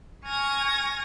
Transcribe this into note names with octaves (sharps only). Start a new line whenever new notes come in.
G#5 C#6 F6 G#6 A#6